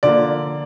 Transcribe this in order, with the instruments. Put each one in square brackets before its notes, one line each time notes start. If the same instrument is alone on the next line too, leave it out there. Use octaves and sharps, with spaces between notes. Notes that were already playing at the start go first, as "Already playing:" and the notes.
[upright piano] D3 F3 A#3 D5